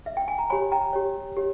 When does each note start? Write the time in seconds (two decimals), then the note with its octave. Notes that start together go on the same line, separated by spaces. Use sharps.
0.06 E5
0.17 G5
0.28 G#5
0.38 A#5
0.50 G4 C#5 G#5 B5
0.72 G5 A#5
0.93 G4 C#5
1.37 G4 C#5